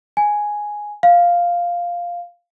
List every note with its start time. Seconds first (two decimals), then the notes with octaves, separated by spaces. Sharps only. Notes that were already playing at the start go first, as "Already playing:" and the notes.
0.17 G#5
1.03 F5